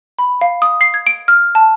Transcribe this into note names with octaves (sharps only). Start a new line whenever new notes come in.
B5
F5
D#6
C7
G#6
D7
F6
A5